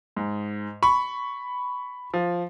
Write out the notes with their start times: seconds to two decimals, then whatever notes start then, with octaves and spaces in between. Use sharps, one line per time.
0.16 G#2
0.83 B5 C#6
2.14 F3